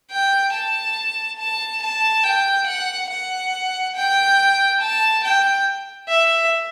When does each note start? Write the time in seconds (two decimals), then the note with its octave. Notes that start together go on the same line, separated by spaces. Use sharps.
0.11 G5
0.53 A5
1.39 A5
1.82 A5
2.24 G5
2.67 F#5
3.10 F#5
3.96 G5
4.80 A5
5.23 G5
6.08 E5